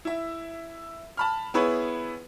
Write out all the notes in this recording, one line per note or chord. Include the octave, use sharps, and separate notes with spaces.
E4 E5
A5 B5 F6
B3 E4 G#4 B4 C#5 B5